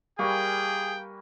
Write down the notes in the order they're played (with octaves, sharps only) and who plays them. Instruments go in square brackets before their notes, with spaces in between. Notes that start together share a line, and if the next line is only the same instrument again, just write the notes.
[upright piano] G3 C#6 [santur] A#3 B4 G#5 [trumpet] G#4 [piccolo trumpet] G5